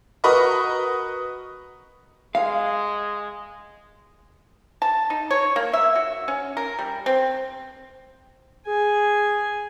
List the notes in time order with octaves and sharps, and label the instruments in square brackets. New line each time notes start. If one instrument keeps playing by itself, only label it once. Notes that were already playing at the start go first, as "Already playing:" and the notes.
[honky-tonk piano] F#4 A#4 B4 D#5 B5 C#6
[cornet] G#3 [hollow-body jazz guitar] F5
[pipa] A5
D#4
C#5
A#3
E5
F#4
C#4
A#4
G3
C4
[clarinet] G#4 [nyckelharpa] G#5